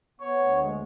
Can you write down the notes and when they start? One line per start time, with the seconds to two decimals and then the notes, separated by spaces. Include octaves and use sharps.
0.20 B3 C#5
0.39 D2
0.58 G#3